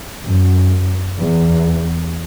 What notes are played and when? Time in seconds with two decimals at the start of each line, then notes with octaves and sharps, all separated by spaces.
0.23 F#2
1.19 E2